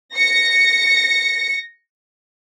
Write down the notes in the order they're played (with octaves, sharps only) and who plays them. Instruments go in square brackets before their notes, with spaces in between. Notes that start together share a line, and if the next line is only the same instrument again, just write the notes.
[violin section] A#6 C#7